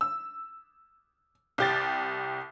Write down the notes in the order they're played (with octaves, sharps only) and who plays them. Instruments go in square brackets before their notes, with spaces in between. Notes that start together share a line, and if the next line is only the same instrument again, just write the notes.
[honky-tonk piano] E6
C2 G4 A6